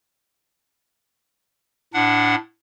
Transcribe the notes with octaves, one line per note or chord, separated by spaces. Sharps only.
A2 D4 F#5